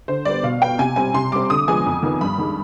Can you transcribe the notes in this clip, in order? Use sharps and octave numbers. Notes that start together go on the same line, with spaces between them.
D3 C5
G3 B3 D5
B2 F5
B3 G5
C3 G#5
G3 C4 G#5
C3 C6
G3 C4 D6
D3 D#6
F3 G#3 B3 G#5
F2
D#3 B3
G2 B5
D#3 G#3